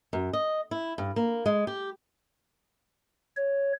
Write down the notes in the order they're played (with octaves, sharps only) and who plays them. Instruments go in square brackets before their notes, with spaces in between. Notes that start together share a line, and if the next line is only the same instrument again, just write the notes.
[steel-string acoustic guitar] F#2
D#5
E4
G2
A#3
G#3
G4
[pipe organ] C#5